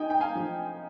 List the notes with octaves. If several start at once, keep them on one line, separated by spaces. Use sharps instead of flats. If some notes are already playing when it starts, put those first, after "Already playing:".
Already playing: D#4 D#5 G5 G#5
G5
F5 G#5
F3